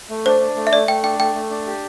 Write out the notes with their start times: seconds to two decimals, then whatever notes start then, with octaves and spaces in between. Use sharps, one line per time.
0.10 A3
0.26 D4 C5
0.41 D4
0.56 A3
0.67 E5
0.72 A3 D5
0.88 A3 G5
1.03 D4 G5
1.19 A3 G5
1.35 A3
1.50 D4
1.67 G4